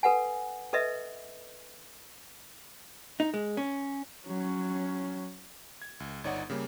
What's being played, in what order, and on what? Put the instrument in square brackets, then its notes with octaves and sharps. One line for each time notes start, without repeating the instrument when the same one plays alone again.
[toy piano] A4 B4 F#5 G#5
A4 B4 D#5 E5
[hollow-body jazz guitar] D#4
G#3
C#4
[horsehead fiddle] F#3 C#4
[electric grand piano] G#6
C#2
G1 D#4 C#5 D5 F#5
C#3 G3 A#3 C#4